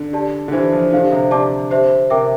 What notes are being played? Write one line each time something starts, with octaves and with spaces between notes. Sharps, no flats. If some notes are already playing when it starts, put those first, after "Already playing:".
Already playing: D3
G4 D5 A5
D3
E3 E4 G4 C5
F3
D3 G4 C5 F5
C3
D3 G4 D5 A5 D6
G4 C5 E5
C3 A#4 E5 G5 D6